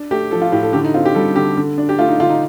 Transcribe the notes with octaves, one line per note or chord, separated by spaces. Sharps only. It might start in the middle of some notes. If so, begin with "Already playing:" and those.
Already playing: D4
A3 G4
F3 A4
F4
A2 G4
A4
D3 G4
D#4
C4 F4
G4
G3 A4
D3 G4
D3
D4
G4
A3 F4
D#4
D3 F4
D#4